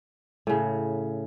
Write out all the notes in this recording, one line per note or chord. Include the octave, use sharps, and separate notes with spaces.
A2 C#3